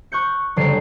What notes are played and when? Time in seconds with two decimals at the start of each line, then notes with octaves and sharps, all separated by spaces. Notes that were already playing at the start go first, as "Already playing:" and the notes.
0.12 C#6 F#6 G6 C#7
0.56 F#1 D3 G3 C#5 C7 D7